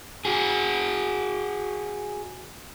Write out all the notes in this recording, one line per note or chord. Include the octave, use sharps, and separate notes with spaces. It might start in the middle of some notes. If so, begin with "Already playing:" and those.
F#4 G#4